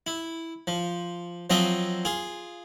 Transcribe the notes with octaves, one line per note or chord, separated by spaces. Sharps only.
E4
F3
F3 F#3 C4 F4 D#5 E5
F4 G#4